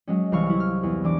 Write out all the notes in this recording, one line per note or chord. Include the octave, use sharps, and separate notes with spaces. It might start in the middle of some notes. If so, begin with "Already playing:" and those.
F#3 G#3 C#4
C2 E3 F5 C#6
E4 F5
F6
E2
E3 D4 D6